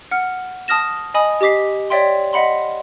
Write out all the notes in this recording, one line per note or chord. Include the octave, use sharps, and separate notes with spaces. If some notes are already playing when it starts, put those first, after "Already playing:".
F#5 F6
A5 D#6 F6 A#6 E7
D#5 G#5 B5 D#6
G4 D#5 D6 B6 C7
C#5 D5 E5 G5 C6
D#5 E5 F#5 B5 C6